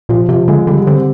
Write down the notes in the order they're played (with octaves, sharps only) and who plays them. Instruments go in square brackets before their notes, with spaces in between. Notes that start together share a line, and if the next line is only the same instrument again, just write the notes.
[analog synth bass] A#2 [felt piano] F3
[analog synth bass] C3 [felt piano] F3
[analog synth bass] D3 [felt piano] G#3
[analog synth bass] D3 [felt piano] G3
[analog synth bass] D3 [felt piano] C4